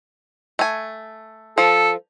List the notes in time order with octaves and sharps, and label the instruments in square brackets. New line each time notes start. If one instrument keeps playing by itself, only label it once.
[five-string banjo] A3 G#5
[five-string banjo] F3 [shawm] A4